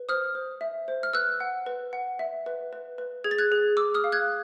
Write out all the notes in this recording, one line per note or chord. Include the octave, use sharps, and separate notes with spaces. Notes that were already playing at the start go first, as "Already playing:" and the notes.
Already playing: B4
C5 D#6 F6
C5
E5
C5
F6
B4 E6 F#6
F#5
B4
F#5
E5
B4
B4
B4
G#4 G#6
A6
F#6 G#6
G#4
G#4 D6 E6
D#6 F6
F5
F#6 G#6